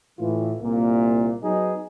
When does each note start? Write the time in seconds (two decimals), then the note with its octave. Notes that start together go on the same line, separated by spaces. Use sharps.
0.19 A2 E3 F4
0.61 C2 A#2 A#3
1.43 F#3 B3 D#4 G#4 D#5